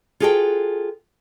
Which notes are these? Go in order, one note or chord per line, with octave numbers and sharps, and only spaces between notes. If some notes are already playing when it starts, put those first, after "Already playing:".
F4 F#4 G#4 A4 B4 G5